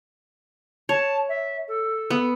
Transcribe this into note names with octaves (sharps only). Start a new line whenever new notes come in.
C#5 A5
E5
A4
B3